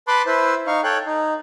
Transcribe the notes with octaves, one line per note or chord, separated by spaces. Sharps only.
B4 A5 B5 C6 D6 F#6
E4 B4 C5
D#4 F5 C#6
A4 C#5 G5 F#6
D#4